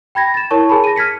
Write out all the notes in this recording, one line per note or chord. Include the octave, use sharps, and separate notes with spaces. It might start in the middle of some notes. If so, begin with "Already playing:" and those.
G5 B5 G#6 A#6
A6 E7
E4 A#4 C#5 A5 C#6
G#4 G#5 A5 B5
A#6 D#7
F6 G#6 B6 C#7